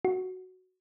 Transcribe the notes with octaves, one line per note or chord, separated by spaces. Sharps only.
F#4